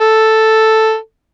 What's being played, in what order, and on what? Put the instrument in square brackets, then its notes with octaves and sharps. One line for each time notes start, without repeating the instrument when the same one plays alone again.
[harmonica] A4